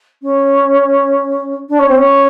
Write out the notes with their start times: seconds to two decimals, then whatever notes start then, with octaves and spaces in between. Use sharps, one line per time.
0.22 C#4
1.69 D4
1.79 C#4
1.88 C4
1.97 C#4